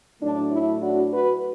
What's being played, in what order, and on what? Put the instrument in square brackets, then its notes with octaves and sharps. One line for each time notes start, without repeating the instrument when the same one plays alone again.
[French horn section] A2 F#3 A3 D4
E4
D4 F#4
F#4 B4